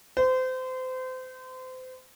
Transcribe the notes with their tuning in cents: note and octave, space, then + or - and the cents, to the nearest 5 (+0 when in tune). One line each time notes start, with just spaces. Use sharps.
C5 -30